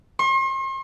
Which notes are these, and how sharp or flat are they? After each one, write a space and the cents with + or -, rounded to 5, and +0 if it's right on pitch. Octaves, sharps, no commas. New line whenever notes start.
C6 +45